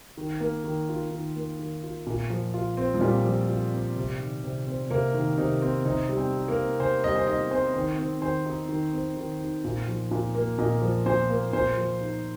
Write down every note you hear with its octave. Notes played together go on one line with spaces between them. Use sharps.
D#3
A#3
D#3
F4
D#3
A#3
D#3
F4
A#2
F3
F4
C4
F3
A#2 G3
F3
F4
C4
C3
D#3
C3
C4
C3 A#3
D#3
C3 D#4
C4
C3 D#4
G3
C4
D#4
A#3
C4
C3 C5
G3 D#5
C5
D#4 D#5
C4 C5
D#3 C5
C4
D#3 C5
D#4
D#3
C4
D#3
D#4
A#2
F3
A#2
A#3
A#2 D#5
F3
A#2 C5
A#3
A#2 C5
F3
D#4